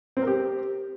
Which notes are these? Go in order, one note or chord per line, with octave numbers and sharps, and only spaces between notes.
C4
A#4
G4